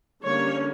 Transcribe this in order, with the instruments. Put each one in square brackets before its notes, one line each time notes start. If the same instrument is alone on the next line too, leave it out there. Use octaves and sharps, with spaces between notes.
[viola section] D3 G3 A#3 C#4 C#5